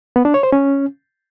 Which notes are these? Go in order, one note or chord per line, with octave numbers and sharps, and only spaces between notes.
B3
D4
C#5
C5
C#4